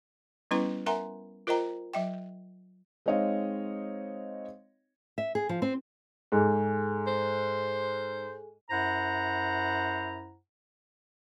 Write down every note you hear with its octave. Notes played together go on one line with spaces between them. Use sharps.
G3 B3 C#4 E4 B4 C6
A#4 E5 F#5 G#5 A#5 C6
F4 A#4 C5 D#5 G5 A#5
F#3 E5 G5
G#3 C4 D#4 C#5 D#5 F5
E5
G#4
F3
C4
G#2 G#4 A4 G#5
C5
F#2 E4 C5 F#5 A#5